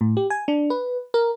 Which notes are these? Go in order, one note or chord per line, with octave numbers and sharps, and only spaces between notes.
A2
G4
G#5
D4
B4
A#4